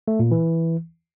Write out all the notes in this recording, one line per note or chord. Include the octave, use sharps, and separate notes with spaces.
A3
A#2
E3